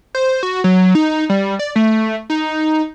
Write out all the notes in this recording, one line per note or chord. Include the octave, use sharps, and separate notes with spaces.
C5
F#4
F#3
D#4
G3
D5
A3
D#4